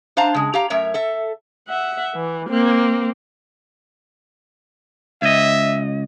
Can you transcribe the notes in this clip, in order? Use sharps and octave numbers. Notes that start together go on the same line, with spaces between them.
D4 C5 F5 A5 A#5
C#3 G#3
G4 F5 A#5
F#2 A3 A#4 C#5 E5
A4 E5
E5 F#5
E3
A#3 C4
C#2 D#5 E5